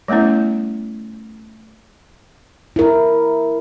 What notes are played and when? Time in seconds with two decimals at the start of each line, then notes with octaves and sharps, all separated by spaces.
0.08 G3 A3 B3 C#4 E4
2.76 E4 A#4